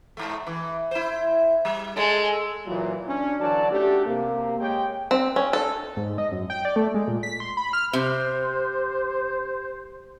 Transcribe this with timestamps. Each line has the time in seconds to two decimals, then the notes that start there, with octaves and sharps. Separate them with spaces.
0.17 G#2 A3
0.47 E3
0.91 E4 C5
1.65 G3
1.96 G#3 A4
2.66 A#2 E3 F#3
3.07 C#4 D4
3.40 D3 E3 F#3 F#4 D5 A5
3.71 A3 C#4 D4 F#4 G4
4.06 C3 A#3
4.59 G#3 G4 C#5 G5
5.11 C4
5.36 C#4
5.53 A4
5.96 G#2
6.18 D#5
6.32 F#2
6.50 G5
6.65 D5
6.76 A3
6.94 G#3
7.08 A#2
7.23 B6
7.40 C6
7.57 B5
7.73 F6
7.93 C3 C5